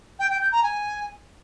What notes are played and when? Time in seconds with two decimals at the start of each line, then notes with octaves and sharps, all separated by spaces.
0.19 G5
0.30 G5
0.41 G6
0.52 A#5
0.63 G#5